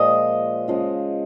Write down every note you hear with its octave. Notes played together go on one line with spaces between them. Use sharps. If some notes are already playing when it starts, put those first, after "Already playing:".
Already playing: A#2 F3 G#3 D#5
C#3 F3 G#3